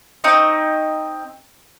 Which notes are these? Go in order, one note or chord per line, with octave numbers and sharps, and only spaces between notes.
C4 D#4 C#6 D#6